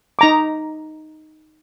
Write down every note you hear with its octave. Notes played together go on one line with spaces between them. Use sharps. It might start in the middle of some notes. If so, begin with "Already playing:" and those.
D#4 A#5 D6